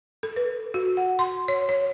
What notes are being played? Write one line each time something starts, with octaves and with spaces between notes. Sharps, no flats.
A4
B4
F#4
F#5
C6
C#5
C#5